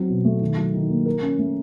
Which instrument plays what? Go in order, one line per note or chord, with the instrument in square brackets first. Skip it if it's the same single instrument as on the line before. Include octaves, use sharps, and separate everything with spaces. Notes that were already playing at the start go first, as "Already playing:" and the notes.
Already playing: [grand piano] F#3 C4
B2
A3
D#3
F#3
D#3
A#3
A#4
C#4
A3